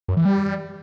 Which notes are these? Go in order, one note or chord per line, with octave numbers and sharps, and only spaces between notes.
F#2
E3
G3